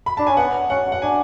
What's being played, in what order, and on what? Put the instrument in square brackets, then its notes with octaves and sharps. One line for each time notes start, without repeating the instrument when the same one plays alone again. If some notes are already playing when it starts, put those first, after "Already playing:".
[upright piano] B5
[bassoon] D4 [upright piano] A5
[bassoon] C#4 [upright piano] G#5
[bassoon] B3 [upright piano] F#5
[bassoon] C#4 [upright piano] F#5
[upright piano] F#5
[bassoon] D4 [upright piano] G#5